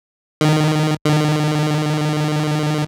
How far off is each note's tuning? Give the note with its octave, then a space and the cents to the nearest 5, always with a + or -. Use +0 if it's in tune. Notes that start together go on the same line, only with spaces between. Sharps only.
D#3 -20
D#3 -45